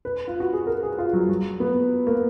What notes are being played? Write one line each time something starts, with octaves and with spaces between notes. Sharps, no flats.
B4
F4
F#4
G#4
A#4
G#4
F4
F#3
F#3
B3
A#3